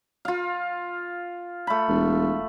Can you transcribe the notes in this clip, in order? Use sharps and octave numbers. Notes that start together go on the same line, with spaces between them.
F4 F5
A3 B5
E1